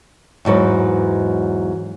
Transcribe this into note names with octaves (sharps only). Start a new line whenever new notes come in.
E2 G#2 F#3 B4